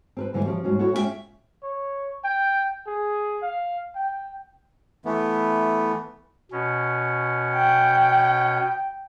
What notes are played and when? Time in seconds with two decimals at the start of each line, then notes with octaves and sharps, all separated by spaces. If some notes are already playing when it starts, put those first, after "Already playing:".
0.17 C4 A#4 B4
0.34 G2 D3 E3 G#3 C4 E5
0.45 F3 C4 G4 C#5
0.64 D#2 G#2 G3 C#4 F#4
0.79 E4 F#4 A4 C#5 F#5
0.93 G#3 C#4 F4 F#4 E5 G5
1.63 C#5
2.24 G5
2.87 G#4
3.42 F5
3.95 G5
5.05 E3 A3 B3
6.52 B2 C#4
7.54 G5